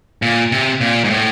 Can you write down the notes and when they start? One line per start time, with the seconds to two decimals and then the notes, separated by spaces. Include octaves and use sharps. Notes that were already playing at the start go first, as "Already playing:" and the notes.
0.22 A#2
0.52 C3
0.81 A#2
1.04 G#2
1.10 A2